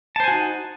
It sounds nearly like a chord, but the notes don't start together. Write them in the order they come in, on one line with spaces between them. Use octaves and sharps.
A5 C5 G#5 F#4 D#4